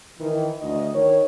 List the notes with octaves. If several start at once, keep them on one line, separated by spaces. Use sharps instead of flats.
D#3 E3
D2 D#5
D#3 C#5